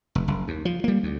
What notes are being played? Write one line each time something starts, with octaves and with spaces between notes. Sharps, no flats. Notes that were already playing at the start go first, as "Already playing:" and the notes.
F1
F#1
D#2
F3
G3 A#3
D2